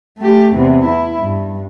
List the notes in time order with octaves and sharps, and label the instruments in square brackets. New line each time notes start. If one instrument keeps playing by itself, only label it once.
[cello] A3 G4
E2 C3
E4
G2